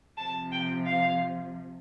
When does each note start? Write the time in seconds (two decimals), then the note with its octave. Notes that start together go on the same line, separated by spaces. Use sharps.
0.18 C3 F3 A5
0.52 G5
0.86 F5